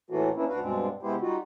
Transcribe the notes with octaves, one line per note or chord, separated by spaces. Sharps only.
A2 E3 A3 A#3 F4 F#4
A#3 B3 C#4 D4 E4
D2 D4 F#4 B4 F5
G2 B2 G#3 C4 D4
C3 G#3 B3 E4 G4 C5
G3 D#4 F4 F#4